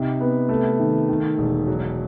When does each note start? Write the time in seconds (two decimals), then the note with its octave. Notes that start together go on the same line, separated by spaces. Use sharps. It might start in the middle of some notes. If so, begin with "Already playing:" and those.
Already playing: C3 D#4
0.20 B3
0.49 A3
0.79 D#3
1.09 D#3
1.38 E1
1.67 F#3